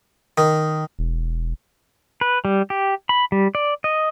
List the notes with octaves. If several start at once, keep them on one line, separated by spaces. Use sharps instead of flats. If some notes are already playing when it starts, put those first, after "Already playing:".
D#3
E1
B4
G3
G4
B5
G3
D5
D#5